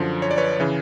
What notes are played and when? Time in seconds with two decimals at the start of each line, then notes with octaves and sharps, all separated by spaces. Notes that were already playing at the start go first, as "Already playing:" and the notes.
Already playing: F#2 D3 F3
0.22 C#5
0.31 D5
0.38 B4 C#5
0.60 C#3 E3